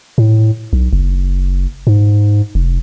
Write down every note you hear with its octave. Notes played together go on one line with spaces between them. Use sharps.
A2
B1
F#1
G#2
F1